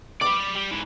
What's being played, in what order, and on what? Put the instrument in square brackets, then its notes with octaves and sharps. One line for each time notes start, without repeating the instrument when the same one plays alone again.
[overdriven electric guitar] D5 B5 [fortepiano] D6
[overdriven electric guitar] G3
G#2 E3